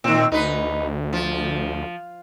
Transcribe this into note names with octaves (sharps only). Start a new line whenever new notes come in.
A#2 D#3 C4
D2 D#4 B4
F3